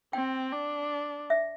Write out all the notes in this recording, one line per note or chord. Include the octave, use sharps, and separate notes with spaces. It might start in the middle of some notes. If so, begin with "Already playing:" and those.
C4 G5
D4
E5